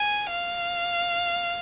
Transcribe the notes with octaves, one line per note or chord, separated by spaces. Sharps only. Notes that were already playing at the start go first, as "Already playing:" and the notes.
Already playing: G#5
F5